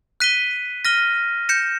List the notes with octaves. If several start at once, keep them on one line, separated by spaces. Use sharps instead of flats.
F#6 B6 D#7 G7
F6 A#6 D#7 G7
G6 A#6 C#7 E7